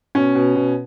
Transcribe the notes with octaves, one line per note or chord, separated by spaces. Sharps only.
B2 C#4
B2
B2